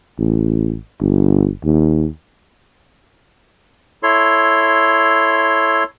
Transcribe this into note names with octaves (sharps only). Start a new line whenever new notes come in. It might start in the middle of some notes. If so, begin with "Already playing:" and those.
A1
G1
D#2
E4 A4 C#5 C6